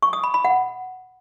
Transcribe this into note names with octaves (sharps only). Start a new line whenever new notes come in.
C#6
D#6
B5
B5
F#5